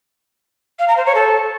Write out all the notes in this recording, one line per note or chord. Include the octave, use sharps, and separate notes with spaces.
F5
A#5
C5
C#5
A4